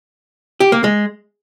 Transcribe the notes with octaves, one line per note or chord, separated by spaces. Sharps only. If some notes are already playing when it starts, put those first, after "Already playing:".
G4
A#3
G#3